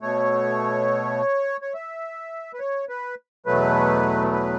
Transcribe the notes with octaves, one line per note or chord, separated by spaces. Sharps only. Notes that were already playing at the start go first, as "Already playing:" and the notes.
B2 A3 C#5
C#5
E5
B4
C#5
B4
E2 B2 F#3 A3 B4
B4